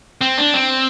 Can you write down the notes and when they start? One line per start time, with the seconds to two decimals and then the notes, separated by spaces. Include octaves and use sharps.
0.21 C4
0.38 D4
0.54 C4